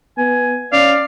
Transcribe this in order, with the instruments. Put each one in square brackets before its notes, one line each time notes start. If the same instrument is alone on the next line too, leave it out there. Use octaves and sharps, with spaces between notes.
[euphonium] B3 [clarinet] G#5
[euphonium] C#4 [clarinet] D5 [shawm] F5